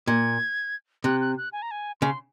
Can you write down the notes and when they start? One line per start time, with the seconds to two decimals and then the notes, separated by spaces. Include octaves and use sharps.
0.07 A#2 G#6
1.04 C3 F#6
1.21 F#6
1.38 F#6
1.53 G#5
1.62 A#5
1.71 G#5
2.01 C#3 C6